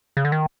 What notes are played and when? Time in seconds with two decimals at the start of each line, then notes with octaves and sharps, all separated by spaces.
0.17 C#3
0.25 D3
0.32 D#3